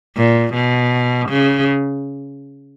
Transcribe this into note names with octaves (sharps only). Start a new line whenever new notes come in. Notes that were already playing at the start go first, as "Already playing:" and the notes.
A#2
B2
C#3